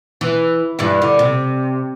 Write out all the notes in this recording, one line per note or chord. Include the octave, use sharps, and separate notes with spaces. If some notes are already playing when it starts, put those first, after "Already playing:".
E3
G2 E3 E4
D3
C3